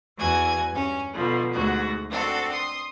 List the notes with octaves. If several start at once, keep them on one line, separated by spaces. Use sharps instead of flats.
E2 F#4 G#5 G#6
G2 C#4
B2 D3 F3
D2 G#2 F#4
C4 D4 F#4 A4
C6 D#6